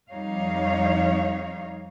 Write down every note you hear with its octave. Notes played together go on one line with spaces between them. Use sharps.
F2 G3 D#4 C#5 F5